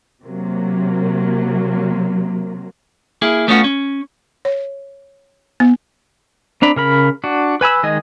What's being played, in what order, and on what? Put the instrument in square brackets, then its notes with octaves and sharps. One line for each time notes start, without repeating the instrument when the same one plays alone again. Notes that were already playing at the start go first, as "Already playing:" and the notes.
[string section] C3 F#3 A#3
[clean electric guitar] A#3 E4 G#4
A3 B3 C#4 F4 F#4
C#4
[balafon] C#5
B3
[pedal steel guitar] C4 D4 A#5 B5
C#3 A#4 B5
D4 F#4
B4 G#5 B5 E6
D#3 G#3 D#5 G#5